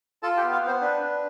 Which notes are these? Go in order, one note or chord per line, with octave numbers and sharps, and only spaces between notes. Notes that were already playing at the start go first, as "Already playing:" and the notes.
F4 A4 A5
G4 G5
B3
F4 F5
B3 C4 C5
D4 B4
D4